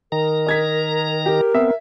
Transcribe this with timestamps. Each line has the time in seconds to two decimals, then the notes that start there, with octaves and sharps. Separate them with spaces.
0.12 D#3 A#4 A#5
0.47 D#5 G#6 B6
1.26 G4 A#4
1.54 B3 C4 E5